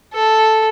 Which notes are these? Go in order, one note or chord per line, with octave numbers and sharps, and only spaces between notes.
A4